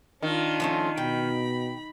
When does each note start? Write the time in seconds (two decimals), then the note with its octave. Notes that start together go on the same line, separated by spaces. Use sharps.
0.22 D#3 D4 F4
0.60 F3 A3 C#4
0.97 B2 G5 B5